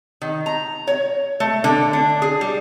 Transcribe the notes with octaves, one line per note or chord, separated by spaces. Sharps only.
D#3
A#5
C#5
A3
D3
D4
G#4
G3